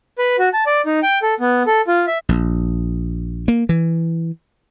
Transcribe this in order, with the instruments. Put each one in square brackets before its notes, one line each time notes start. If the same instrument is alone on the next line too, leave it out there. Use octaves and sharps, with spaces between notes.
[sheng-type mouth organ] B4
F#4
A5
D5
D#4
G5
A4
B3
A4
F4
E5
[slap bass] A#1
A#3
E3